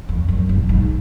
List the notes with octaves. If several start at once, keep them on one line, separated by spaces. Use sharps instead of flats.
F2
F#2
G2
G#2